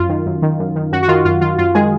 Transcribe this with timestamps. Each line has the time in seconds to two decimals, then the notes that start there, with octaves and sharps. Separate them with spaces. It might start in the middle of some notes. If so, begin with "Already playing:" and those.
Already playing: F#2 F4
0.09 D#3
0.26 F#2
0.42 D#3
0.59 F#2
0.76 D#3
0.92 F#2 F#4
1.03 F#4
1.08 D#3 F4
1.25 F#2 F4
1.41 D#3 F4
1.58 F#2 F4
1.75 D#3 G#3 G#4